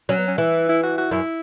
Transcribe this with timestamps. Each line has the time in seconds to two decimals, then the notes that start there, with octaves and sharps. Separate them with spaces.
0.09 F#3 C#4
0.18 B3
0.28 C#4
0.38 E3 E4
0.69 E4
0.83 F#4
0.98 F#4
1.11 F#2 E4